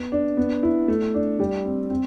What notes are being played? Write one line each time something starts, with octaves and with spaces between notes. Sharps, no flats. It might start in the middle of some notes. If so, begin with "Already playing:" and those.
Already playing: B3
D4
B3
E4
A3
D4
G3
C4
C4